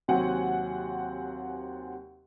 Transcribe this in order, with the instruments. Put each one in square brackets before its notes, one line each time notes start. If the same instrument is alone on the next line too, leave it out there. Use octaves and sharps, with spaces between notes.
[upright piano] D#2 C3 F#3 C4 F#5 G#5